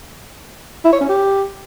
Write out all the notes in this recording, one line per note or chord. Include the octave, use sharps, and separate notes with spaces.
E4
C#5
C#4
G4